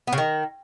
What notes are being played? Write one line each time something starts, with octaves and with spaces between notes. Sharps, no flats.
B3
C#3
D#3